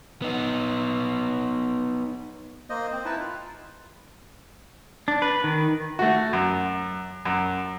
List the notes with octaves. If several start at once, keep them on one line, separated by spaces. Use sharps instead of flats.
B3 D#4
A#3 C5 D#5
C4 C5
D#4 E4 B4 A5
F4
D4
B4
D#3
A3 F#4
F#2
F#2